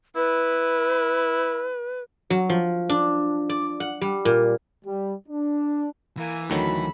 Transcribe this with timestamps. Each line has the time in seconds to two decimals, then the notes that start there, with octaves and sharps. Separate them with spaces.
0.16 E4 B4
2.30 F#3
2.49 F3
2.89 D4
3.49 D5
3.80 F#5
4.01 G3
4.25 A#2
4.85 G3
5.29 D4
6.17 E3 A#3 G#5
6.50 D2 D#3 F#3 A4 B5